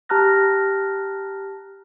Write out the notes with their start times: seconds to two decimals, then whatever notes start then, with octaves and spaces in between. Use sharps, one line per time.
0.09 G4 A5 A#5 F6 F#6 A#6